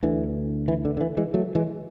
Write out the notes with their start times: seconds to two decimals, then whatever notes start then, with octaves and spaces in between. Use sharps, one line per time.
0.03 D2 D3 E3
0.68 E3
0.85 D3
0.97 D3
1.01 E3
1.17 E3 G#3
1.34 F#3 A3
1.55 E3 G#3